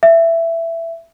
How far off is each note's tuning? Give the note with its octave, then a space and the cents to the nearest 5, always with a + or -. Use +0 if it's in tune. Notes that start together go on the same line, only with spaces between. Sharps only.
E5 +15